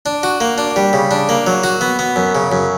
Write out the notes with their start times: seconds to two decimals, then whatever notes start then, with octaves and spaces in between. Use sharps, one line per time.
0.06 D4
0.23 F#4
0.41 A#3
0.58 D4
0.76 G3
0.93 C#3
1.11 D4
1.29 A#3
1.47 F#3
1.64 F#4
1.81 B3
1.99 B3
2.16 F#2
2.35 C#3
2.52 F#2